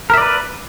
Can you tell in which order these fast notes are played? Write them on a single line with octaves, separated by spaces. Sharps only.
A#4 E5 D5 B4